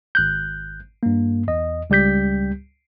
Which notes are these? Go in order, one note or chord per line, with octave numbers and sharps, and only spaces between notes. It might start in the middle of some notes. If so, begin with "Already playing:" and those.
G#1 F#6 G6
G2 A#3
E2 D#5
C#2 G3 G4 G6 B6